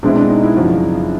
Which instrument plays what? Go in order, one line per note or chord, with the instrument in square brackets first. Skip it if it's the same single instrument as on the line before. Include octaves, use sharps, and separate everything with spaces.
[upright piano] B2 G#3 C4 E4 [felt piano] D4
[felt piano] D4
D#4
E4
[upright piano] F#2 C#3 F3 [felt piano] F#4